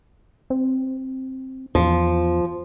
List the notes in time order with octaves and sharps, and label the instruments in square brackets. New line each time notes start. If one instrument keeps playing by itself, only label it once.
[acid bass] C4
[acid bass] E2 [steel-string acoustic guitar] F3